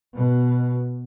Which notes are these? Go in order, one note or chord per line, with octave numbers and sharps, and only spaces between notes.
B2